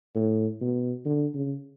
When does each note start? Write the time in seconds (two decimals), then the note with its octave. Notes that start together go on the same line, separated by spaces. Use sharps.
0.15 A2
0.61 B2
1.06 D3
1.34 C#3